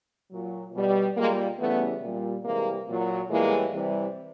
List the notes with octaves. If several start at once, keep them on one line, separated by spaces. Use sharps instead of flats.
A#2 F#3
B2 G3
A#2 G3 G#3 A#3
C#3 E3 G3 A3 B3
A#2 G3
C3 E3 G3 G#3 A#3
A#2 F#3
A2 E3 G3 G#3 A#3
C3 E3 G3